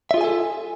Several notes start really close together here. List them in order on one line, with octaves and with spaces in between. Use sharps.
E5 F4 G#4 G#5 A4